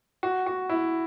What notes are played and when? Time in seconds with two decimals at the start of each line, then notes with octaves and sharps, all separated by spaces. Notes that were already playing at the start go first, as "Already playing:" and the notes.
0.23 F#4
0.46 F#4
0.69 E4